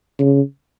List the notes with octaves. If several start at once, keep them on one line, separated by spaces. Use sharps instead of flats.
C#3